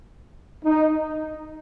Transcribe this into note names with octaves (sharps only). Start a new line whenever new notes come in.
D#4